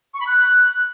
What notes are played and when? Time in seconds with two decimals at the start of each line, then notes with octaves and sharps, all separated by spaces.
0.14 C#6
0.20 B5
0.27 F#6